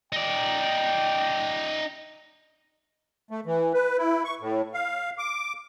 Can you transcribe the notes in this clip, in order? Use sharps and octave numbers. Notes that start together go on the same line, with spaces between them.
D#4 D5 G5
A3
E3
B4
E4
C#6
A2
F5
D6